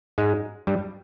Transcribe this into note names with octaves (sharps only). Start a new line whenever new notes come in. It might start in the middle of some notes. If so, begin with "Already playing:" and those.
G#2 G#3
G2 G3